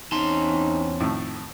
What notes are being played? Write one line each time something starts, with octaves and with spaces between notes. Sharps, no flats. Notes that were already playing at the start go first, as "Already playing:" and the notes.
E2 C4 C#4 D#4 A5 C6
F2 A2 D#3